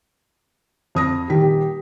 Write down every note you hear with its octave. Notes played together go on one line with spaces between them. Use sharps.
F2 D#6 A#6
D#1 D#3 G4 B6